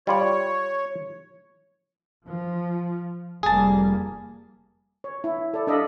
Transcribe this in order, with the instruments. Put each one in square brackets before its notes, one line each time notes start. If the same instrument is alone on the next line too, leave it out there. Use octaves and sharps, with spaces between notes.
[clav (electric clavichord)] G3 F4 D5 [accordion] C#5
[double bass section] F3
[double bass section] F1 G3 A#3 [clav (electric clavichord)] G#4 A5
[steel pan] C#5
E4
A4 D5
D4 A4 D5 D#5 F5 B5